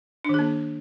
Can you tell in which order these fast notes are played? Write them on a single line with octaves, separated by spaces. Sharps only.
D4 D#3 G#4 A#3